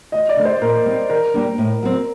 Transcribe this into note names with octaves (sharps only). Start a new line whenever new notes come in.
D2 D#5
D5
D3 A3 D#4
C5
A#2 A#4
G3 C4 D#4
D#3 A#4
G3 A#3 D4
A2
F#3 C4